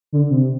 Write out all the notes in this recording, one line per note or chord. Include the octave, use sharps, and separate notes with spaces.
D3
C3